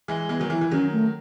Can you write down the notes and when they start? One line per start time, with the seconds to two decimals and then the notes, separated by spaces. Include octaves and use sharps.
0.08 E3 G#3
0.29 E3 G#3 B3
0.40 D#3 F#3
0.50 E3 E4
0.61 E3
0.71 D#3 F#3 C#4
0.92 A3